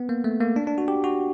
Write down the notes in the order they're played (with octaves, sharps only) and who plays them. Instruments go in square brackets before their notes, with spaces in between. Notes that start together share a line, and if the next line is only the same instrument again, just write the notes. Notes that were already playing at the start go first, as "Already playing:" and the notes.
Already playing: [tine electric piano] B3
A#3
A3
A#3
D4
D4
F#4
G4
F#4